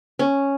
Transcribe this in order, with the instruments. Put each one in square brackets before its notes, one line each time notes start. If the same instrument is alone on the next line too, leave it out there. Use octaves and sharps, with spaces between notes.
[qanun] C#4